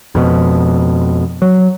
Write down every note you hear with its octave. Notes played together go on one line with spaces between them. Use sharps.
F2 B2
F#3